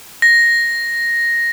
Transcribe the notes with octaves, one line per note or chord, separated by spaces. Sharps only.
A#6